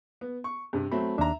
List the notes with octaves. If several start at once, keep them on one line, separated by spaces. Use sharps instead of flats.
B3
C#6
G2 C3
F#3 A3 C4 B5
D#2 D4 E5 A#5